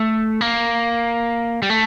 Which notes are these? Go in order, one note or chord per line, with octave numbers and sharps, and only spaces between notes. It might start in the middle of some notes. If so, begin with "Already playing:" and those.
Already playing: A3
A#3
G3
A3